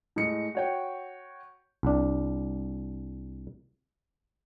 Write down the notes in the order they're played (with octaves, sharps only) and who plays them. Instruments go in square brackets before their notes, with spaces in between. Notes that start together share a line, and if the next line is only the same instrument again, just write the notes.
[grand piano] A2 G#3 C#7
F#4 C#5 G5
[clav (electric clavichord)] C2 D4